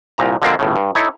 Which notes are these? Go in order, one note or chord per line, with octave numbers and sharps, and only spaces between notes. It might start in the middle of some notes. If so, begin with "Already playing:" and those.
C2 A#2 A#5
D3 F3 G#3 A#3 C4 D4
G1 A2 C#3
G2
D#4 E4 A4 C#5